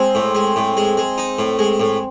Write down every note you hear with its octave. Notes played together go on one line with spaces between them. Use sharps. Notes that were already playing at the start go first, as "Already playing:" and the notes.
Already playing: G#3 C4
A2
G#3
A2
G#3
G#3
D#4
A2
G#3
A2